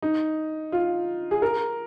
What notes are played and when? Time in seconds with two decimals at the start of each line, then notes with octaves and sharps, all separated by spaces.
0.02 D#4
0.72 F4
1.31 G#4
1.42 A#4